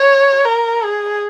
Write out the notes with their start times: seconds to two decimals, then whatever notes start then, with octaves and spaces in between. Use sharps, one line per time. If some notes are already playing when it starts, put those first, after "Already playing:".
Already playing: C#5
0.45 A#4
0.84 G#4